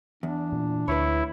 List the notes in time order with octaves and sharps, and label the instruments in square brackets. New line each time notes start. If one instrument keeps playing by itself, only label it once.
[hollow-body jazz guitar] E2 [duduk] D4
[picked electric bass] A#2
[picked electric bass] D2 [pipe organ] E4 [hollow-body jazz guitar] B4 C#5